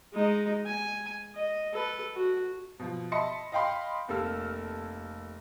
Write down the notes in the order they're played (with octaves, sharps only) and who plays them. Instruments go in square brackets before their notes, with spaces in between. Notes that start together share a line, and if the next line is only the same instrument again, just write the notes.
[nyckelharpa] G#3 D#4
G#5
D#5
A4 B4
F#4
[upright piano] B2 F3
D#5 E5 A5 B5 C6 C#7
D#5 F5 G5 B5 C6
F1 A#3 A4 E6 F6